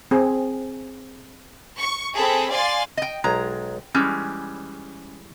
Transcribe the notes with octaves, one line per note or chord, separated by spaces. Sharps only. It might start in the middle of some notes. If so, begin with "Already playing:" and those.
C4 G#4
C#6
C4 G#4 A4 B5
D5 F5 G#5 C6 A6
D#5 G5
B1 G#3 A#5
E3 G3 G#3 C#4